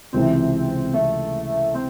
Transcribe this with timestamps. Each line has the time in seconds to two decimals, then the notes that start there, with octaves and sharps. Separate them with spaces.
0.13 C#2 C3 E3 C4
0.94 A3
1.75 C4